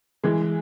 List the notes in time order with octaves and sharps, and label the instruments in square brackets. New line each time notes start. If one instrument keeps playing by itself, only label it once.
[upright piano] E3 G#3